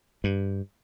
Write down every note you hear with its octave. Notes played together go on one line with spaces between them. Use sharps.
G2